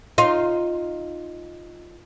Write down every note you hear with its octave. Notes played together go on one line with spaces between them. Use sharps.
D#4 F4